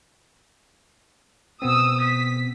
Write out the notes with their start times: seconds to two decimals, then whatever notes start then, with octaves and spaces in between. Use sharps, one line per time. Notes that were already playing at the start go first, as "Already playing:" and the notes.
1.62 B2 B3 C4 D#6 E6
2.03 B6